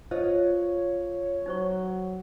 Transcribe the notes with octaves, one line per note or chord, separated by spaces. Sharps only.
F4 C5 C#5 D#5
F#3 D#4 C5 C#6